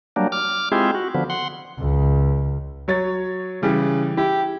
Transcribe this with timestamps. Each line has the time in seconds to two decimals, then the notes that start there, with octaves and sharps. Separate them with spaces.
0.16 F#3 G3 A#3 D4
0.32 D6 F6
0.72 G#3 C4 E4 F4 G4 G#4
0.95 F#4
1.15 D3 F3 B3
1.30 F#5 C6
1.80 C#2
2.88 F#3 C#5 A6
3.63 C#3 E3 G3
4.17 E4 G4